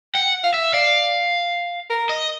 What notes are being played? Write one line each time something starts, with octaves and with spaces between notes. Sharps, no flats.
F#5 G5
F5
E5
D5 F5
A#4
D#5